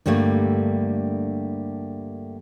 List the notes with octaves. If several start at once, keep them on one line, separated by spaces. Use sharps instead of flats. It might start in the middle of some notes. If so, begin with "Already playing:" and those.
G2 D3 G3 A3 A#3